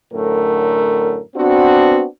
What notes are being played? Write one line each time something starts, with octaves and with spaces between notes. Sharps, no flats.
F#2 A2 D3 A3 A#4
B3 C4 D4 F#4